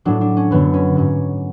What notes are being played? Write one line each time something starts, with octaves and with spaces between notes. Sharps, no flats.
A2 F#3 D4
D4
C#4
F#2 D3 F#3 B3
C#4
G#2 F#3 C#4